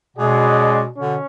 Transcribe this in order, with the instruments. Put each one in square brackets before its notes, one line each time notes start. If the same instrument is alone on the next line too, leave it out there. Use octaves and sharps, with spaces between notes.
[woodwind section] B2 [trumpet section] G#3 C#4 G#4 D5 F#5
[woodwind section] B2 D3 [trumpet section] C#4